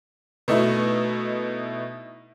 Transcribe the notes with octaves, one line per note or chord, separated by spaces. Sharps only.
B2 A3 D#4 E4